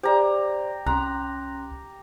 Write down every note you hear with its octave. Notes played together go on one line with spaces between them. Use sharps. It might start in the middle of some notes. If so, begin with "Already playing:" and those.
G4 C5 D5 A#5
C2 C#4 A#5 C6 F#6